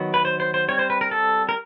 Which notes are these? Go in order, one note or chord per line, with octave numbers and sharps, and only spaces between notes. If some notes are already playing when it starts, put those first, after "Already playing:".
Already playing: D#3 F#3 B3
B4
C5
C5
C5
G3 C4 C#5
C5
B4
A#4
A4
A#4